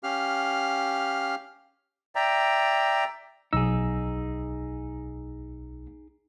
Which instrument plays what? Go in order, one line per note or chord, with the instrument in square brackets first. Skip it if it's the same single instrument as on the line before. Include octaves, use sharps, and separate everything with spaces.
[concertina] C#4 G4 F5 F6
[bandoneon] D5 E5 G5 A#5
[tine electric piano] B1 E6 [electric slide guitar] D#4 G#4